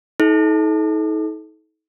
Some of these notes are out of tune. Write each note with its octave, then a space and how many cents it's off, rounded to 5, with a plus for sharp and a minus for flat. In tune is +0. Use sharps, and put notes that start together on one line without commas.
D#4 +40 A4 -35